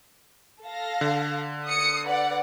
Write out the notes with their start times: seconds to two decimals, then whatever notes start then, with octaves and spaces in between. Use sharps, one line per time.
0.63 A4 F5 A#6
1.01 D3
1.66 D#6 C#7
2.06 B4 D5 F#5